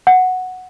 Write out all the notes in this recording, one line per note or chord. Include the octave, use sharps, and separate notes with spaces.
F#5